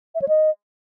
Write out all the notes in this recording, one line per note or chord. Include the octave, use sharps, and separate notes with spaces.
E5
C#5
D#5